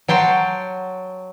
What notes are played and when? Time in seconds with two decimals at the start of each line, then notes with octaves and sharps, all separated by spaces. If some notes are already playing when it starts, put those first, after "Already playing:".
0.08 F#3 G5 A5 C6